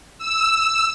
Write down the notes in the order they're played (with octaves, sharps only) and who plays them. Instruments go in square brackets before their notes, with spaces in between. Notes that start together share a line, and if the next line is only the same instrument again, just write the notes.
[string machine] E6